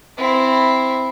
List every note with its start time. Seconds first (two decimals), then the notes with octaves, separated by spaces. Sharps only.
0.18 C4 E4